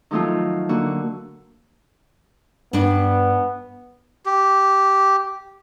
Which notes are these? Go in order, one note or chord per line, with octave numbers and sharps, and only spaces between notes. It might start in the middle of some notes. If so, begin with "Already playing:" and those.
D#3 F3 F#3 A3 F4
D3 A#3 F#4
G2 B3 D4
G4